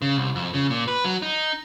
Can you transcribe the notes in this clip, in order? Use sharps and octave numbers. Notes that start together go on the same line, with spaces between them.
C#3
C2
F2
C#3
A#2
B4
F#3
D#4